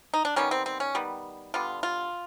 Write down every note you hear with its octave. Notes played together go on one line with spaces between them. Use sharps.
D#4
D4
D#3 G3 B3 C#4
C4
C4
C#4
D#3 G3 B3
D3 G3 B3 F4
F4